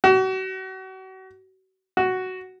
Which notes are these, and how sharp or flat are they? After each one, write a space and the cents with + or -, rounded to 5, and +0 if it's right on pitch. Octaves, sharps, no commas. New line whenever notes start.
F#4 +35
F#4 +5